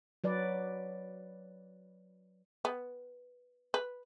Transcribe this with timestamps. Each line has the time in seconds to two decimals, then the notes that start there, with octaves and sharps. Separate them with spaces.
0.24 F#3 B4 D5
2.65 B3
3.74 B4